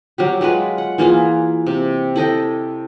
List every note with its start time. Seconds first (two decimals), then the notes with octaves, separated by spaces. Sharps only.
0.18 F#3 G3 G4
0.41 F#3 G#3 F4 B4
0.78 F#5
0.98 E3 A#3 F4 G#4
1.67 C3
2.16 E4 A4 D#5 G5